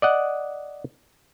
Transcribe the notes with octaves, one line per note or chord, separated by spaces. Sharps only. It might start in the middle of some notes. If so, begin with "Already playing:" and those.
D5 D#5 F#5